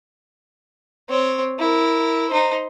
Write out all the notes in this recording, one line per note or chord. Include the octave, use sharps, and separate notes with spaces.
C4 C#5
E4 A#4
D#4 C5